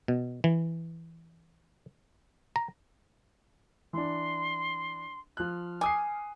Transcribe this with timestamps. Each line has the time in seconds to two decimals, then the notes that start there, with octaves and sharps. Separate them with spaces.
0.08 B2
0.44 E3
2.56 A#5
3.93 E3 D4 C6
5.37 F3 F6 F#6
5.81 G#5 D6 D#6 C7